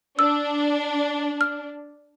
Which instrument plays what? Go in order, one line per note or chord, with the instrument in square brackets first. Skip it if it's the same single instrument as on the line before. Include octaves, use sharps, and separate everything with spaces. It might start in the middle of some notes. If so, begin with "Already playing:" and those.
[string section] D4 [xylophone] E6
[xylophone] F6